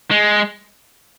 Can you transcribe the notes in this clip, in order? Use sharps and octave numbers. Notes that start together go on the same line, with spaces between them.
G#3